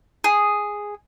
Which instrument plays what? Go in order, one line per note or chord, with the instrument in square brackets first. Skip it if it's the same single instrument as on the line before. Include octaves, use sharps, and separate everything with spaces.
[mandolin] G#4